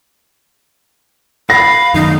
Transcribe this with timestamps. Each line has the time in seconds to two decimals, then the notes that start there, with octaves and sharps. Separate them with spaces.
1.50 F5 B5 A#6
1.94 F#2 D#3 D#4